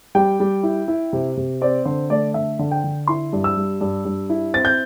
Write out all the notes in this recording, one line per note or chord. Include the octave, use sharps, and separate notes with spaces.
G3 G5
G3
E4
E4
C3
C3
C4 D5
D3 C5
A3 D5
D3 E5
D3
G5
D3
E4 C6
G2
E6
G3
G2
G2
E4
C4 A6
G6